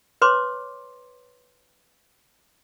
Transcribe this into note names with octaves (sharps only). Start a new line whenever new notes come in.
B4 C#5 C6 D6